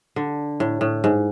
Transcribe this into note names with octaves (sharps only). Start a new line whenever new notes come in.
D3
A2
A2
G#2